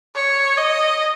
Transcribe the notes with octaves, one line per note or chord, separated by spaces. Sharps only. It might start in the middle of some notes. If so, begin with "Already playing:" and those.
C#5
D#5